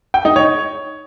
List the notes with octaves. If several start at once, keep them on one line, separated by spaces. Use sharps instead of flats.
G5
D#4
C#5